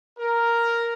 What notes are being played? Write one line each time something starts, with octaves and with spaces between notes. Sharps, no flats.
A#4